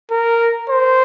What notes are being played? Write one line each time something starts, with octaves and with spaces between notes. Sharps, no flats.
A#4
C5